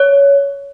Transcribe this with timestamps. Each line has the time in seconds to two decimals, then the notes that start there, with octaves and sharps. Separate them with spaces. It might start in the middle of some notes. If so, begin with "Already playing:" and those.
Already playing: C#5